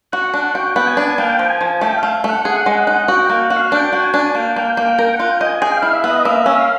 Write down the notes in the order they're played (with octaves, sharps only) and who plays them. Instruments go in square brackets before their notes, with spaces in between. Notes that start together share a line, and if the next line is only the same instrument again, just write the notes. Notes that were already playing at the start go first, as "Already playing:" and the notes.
[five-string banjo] F#4 [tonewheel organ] F#5
[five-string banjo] D4 [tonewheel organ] F#5
[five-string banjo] F#4 [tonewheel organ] G5
[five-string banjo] B3
[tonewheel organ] G#5
[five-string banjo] D4
[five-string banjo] A#3 [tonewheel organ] G5
[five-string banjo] F3
[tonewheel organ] G#5
[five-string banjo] F3
[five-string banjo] A3 [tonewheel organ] G5
[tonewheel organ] F5
[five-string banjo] A3
[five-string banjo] A3 [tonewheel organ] F#5
[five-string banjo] G#4
G#3
D#4
[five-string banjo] F#4 [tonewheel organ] G5
[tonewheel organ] G5
[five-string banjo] A#3
[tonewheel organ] F#5
[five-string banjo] F#4
[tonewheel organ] F5
[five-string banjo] D4 [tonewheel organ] G5
[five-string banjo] F#4
[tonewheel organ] G#5
[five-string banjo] D4
[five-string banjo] A#3 [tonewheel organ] G5
[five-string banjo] A#3 [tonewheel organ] G5
[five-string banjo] A#3 [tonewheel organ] G5
[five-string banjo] A#4 [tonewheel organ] G5
[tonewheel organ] F#5
[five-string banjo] F4
[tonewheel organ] G5
[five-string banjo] D#5
[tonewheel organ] G#5
[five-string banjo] G#4 [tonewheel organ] G5
[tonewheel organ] F5
[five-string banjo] E4
[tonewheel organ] E5
[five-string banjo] B3
[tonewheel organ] D#5
[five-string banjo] A#3 [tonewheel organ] E5
[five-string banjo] C#4
[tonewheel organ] F5